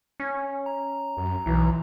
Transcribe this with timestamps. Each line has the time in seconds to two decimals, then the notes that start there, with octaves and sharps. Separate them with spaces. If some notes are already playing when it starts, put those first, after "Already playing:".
0.20 C#4
0.66 A#5
1.17 F#2
1.46 B1 E3